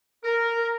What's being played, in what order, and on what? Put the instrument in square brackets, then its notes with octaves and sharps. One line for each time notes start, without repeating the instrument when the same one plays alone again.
[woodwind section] A#4